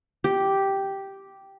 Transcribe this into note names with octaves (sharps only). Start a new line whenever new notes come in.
G4